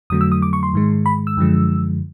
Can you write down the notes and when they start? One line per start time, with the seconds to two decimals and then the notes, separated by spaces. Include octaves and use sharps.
0.10 F2 D3 F#3 A3 D#6
0.21 E6
0.32 D#6
0.42 D6
0.53 C#6
0.63 C6
0.73 G#2 D#3 G#3
1.06 B5
1.27 E6
1.37 F#2 D3 F3 G#3